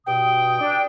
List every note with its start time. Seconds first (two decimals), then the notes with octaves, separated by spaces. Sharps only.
0.07 G2 B2 G5 D#6
0.61 D4